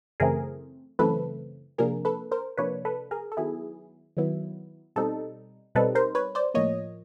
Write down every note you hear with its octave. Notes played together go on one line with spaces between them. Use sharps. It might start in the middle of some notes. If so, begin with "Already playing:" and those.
F#2 C#3 E3 A3 C4 G#4 A#4
F#2 C#3 E3 A3 C4 A4 B4
C3 F3 A#3 D4 G#4 A#4
A4 B4
A#4 C5
C3 F3 A#3 D4 B4 C#5
A4 B4
G#4 A#4
A4
D#3 F#3 B3 E4 G#4
D#3 F#3 B3 E4
B2 G3 C4 D#4 A4
B2 G3 C4 D#4 A4 B4
A#4 C5
B4 C#5
C5 D5
A2 F3 A#3 C#5 D#5